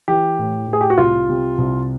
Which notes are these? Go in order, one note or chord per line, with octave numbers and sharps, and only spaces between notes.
E3 G4
A2
A2
G#4
G4
F#4
C2 F4
C3
C2